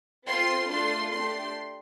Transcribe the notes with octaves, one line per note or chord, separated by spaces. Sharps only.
C4 F4 A4 C6
A3 D4 F4 A4 C6
A3 D4 G4 C6